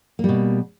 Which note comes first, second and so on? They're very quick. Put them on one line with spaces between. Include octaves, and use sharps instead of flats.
A#3 G3 B2